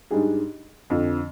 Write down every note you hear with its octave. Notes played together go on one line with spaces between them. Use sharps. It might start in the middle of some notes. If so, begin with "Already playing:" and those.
G#2 G3 D4 G#4
F2 D3 F3